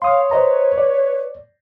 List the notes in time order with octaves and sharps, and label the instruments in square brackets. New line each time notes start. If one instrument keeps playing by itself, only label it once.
[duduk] C#5 [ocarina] F5 [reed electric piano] C6 D#6
[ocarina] B4 [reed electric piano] C5 D#5 A#5
[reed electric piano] D5